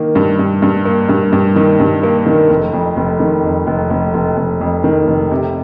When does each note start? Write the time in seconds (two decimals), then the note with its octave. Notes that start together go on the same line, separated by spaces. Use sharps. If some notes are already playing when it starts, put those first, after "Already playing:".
Already playing: D#3 A#3
0.15 G2
0.39 G2
0.62 G2
0.86 A#3
1.09 G2
1.33 G2
1.56 D#3
1.80 G2
2.03 A#3
2.26 D#3
2.50 F1
2.73 F2
2.97 F1
3.20 D#3
3.44 F2
3.67 F1
3.90 F1
4.14 F1
4.37 F1
4.61 F2
4.84 D#3
5.07 F1
5.31 C3